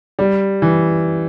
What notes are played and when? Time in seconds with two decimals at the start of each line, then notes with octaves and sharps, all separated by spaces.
0.19 G3
0.62 E3